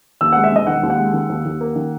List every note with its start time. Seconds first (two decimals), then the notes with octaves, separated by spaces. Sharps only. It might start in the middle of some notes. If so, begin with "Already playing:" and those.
0.21 D#2 E6
0.33 G#3 F#5
0.44 E5
0.52 E1 D#5
0.67 D#3 F#5
0.83 D#2
0.90 F#5
0.98 G#3
1.13 D#3
1.29 D#2
1.45 D#2
1.61 A#3
1.75 D#3